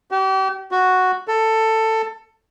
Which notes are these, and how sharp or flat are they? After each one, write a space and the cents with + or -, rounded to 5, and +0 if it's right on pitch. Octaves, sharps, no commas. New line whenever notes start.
G4 -40
F#4 +0
A4 +15